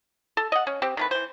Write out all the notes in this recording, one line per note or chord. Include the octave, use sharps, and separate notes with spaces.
A4
D#5 F#5
C#4
C4 G4
D#3 A3 B4
E3 C5